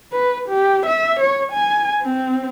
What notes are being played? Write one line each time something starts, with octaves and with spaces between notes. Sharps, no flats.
B4
G4
E5
C#5
G#5
C4